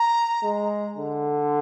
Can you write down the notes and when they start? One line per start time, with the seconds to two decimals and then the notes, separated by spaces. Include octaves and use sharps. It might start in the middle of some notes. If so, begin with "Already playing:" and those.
Already playing: A#5
0.43 G#3
0.97 D3